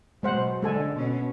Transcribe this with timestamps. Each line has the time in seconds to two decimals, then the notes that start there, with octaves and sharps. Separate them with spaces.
0.23 B2 F#3 G#3 C5 F#5
0.62 D3 G#3 A4 G#5
0.95 B2 C#4